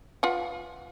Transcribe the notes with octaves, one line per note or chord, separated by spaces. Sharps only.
F4 B4 F#5